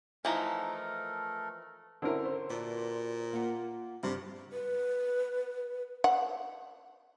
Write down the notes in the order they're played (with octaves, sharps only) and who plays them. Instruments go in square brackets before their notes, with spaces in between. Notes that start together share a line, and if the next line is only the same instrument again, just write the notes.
[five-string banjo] E3 F3 D#4 [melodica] A3 A4 A#4
[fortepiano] D3 A#4 [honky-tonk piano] C4 C#4 E4
[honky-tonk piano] C5
[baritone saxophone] A#2 [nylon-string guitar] F#4 B4 D5
[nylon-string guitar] A#3 F4 F#5
[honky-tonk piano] G2 [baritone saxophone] C3
[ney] B4
[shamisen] F#5